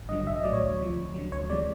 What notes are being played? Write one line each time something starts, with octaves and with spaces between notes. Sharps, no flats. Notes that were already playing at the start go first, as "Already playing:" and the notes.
Already playing: G#1
G2 D3 F#3 D#5
A#1 E5
D#5
A2 F#3 D5
C#5
D2
C3 F3
D2
D3 F#3
D2 C#5
C3 E3 G#3 D5